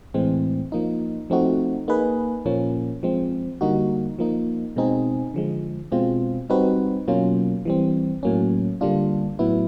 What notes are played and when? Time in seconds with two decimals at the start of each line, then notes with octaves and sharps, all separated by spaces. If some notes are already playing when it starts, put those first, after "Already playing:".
0.14 A2 E3 G#3 C4
0.72 F3 A#3 D#4
1.30 F3 A3 C4 D#4 F#4
1.88 A#3 D#4 G#4 B4
2.45 A#2 F3 A#3 C#4
3.03 F3 G#3 C4
3.61 D3 G3 A#3 D#4 F#4
4.19 F3 A#3 D#4
4.76 B2 G#3 C4 D#4 G#4
5.34 D3 F3 G#3
5.92 B2 G#3 C4 F4
6.50 G3 C4 D#4 F#4 B4
7.08 B2 F#3 A#3 C#4 F4
7.65 E3 G3 C4
8.23 A2 F#3 A#3 C#4
8.81 D3 G3 A#3 D4 F4
9.39 A2 F#3 B3 E4